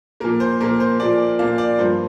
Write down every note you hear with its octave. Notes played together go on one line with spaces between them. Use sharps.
A#2 F3 A#3 A#4
C5
A#2 F3 A#3 A#4
C5
A#2 F3 A#3 D5
A#2 F3 A#3 F5
D5
G2 F3 A#3 C5